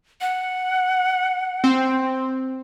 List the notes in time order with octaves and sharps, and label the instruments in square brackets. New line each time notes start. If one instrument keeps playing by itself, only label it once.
[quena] F#5
[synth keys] C4